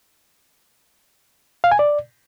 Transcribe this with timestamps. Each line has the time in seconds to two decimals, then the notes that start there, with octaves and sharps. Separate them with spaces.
1.64 F5
1.72 G#5
1.79 D5